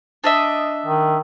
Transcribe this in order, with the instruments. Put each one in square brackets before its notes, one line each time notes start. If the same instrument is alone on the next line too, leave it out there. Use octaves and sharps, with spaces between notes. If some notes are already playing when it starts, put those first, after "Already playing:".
[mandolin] D4 D#5 E5
[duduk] D#3